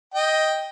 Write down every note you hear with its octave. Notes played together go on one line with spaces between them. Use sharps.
D#5 G5